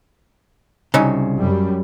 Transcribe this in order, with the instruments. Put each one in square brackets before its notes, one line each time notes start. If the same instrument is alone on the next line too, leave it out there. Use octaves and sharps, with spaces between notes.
[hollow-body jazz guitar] C2 C#3 [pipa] F#3 C#4 D#4
[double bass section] F#2 G3